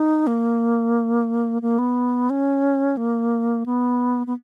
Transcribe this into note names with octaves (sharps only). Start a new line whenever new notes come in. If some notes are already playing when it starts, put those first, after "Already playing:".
Already playing: D#4
A#3
A#3
B3
C#4
A#3
B3
B3